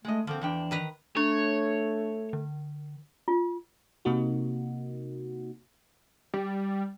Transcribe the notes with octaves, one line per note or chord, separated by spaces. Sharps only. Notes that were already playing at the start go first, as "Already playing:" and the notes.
G#3 A3 D#5
D3 F3 A#3 C4
E2 E3 D4 G5
D#3 B4 A#5
A3 D4 C#5
D3
F4
C3 A#3 D#4 F#4
G3